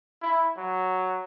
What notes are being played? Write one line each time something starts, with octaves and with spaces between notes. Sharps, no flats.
E4
F#3